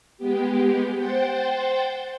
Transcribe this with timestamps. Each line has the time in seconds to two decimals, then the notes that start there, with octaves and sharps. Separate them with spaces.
0.18 G#3 B3 G4
0.96 C5 F#5 G5 C6 A6